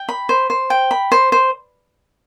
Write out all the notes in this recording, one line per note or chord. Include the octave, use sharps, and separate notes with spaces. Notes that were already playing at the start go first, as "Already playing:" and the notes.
Already playing: G5
B5
C5
C5
G5
B5
C5
C5